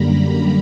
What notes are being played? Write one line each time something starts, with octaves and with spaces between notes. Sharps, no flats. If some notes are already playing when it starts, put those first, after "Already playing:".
Already playing: F#2 D3 G3 A#3 A#5 B5
B5